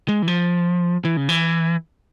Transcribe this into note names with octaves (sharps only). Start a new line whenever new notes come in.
G#3
E3
F3
E3
C#3
E3